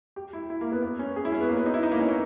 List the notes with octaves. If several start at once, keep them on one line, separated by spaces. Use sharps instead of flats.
G4
E4
E4
A#3
B3
B3
C#4
G#4
E4
C#4
B3
A#3
B3
D#4
E4
D#4
A#3
C#4
A#3